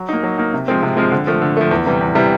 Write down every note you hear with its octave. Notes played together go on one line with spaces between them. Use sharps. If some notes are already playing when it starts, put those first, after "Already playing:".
Already playing: F#3
A#3 D#4
F#3
A#3 D#4
C3
F3 G#3 C4
C3
F3 G#3 C4
D3
F3 A3
D3
F3 A3
E2
C3 E3 G3
E2
C3 E3 G3